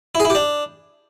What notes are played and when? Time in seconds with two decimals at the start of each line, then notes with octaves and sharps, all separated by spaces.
0.15 E4
0.20 G#4
0.25 E4
0.30 G4
0.35 D4